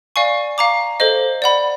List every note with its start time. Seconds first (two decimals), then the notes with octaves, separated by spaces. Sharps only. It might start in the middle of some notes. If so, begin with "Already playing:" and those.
0.16 D5 F5 G#5 C#6
0.58 F5 A#5 D6
1.00 A4 C5 D#5
1.42 D5 F#5 B5